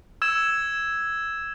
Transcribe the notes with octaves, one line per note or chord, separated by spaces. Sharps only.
E6 G#6 E7